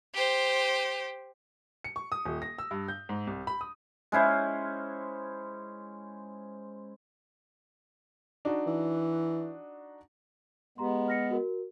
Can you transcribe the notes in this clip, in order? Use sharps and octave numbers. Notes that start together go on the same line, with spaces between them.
G4 C5
C#7
C#6
D#6
D#1
A#6
E6
G2
G6
G#2
C2
B5
D#6
G#3 C#4 E4 C5
D4 D#4 F#4
E3
G#3 B3 G4 A#5 C6
F6 A#6 C#7
F#4 A#4